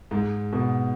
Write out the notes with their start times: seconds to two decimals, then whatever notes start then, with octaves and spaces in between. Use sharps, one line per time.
0.11 G#2
0.53 B2